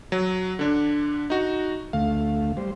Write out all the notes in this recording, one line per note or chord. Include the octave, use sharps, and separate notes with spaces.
F#3
D3 D4
D#4 F#4
D2 A3 F5
G3 C5